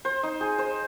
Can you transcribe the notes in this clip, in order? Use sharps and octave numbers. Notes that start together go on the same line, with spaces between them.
C5
D#4
G#4
C5